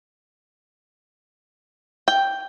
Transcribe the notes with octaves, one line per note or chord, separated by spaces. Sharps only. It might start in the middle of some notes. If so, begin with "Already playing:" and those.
G5